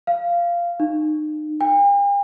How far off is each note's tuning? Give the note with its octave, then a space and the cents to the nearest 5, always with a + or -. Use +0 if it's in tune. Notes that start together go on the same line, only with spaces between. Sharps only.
F5 -10
D#4 -35
G5 +45